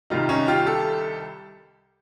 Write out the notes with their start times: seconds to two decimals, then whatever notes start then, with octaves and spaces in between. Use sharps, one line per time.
0.10 C2 C3 D#3 G3 D#4 F4
0.29 C#4 D#4
0.48 F4 G4
0.66 G4 A4